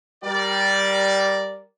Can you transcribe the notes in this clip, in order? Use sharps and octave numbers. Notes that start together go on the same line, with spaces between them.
G3 G4 A#4 D5